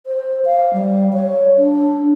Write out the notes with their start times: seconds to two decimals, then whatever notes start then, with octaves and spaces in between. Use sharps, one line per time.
0.06 C5
0.45 F5
0.73 G3
1.13 C#5
1.58 D4